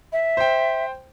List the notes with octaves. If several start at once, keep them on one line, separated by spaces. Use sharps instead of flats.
E5
C5 G5